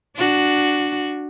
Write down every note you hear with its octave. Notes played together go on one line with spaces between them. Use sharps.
D4 F#4